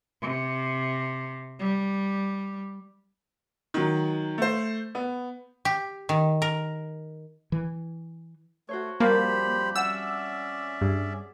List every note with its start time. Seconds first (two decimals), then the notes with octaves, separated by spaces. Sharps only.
0.22 C3
1.59 G3
3.74 D#3 F#3
4.38 A3 C5
4.95 B3
5.65 G4
6.09 D#3
6.42 A#4
7.52 E3
8.69 A3 F#4 C5 C#5
9.00 F2 G3 A#3 G4 C5 A5 B5
9.75 C#4 D5 E5 F#5 E6
10.81 G2 G#4